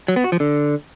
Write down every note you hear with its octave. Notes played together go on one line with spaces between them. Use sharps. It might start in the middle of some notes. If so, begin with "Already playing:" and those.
F#3
B3
F#4
F3
D3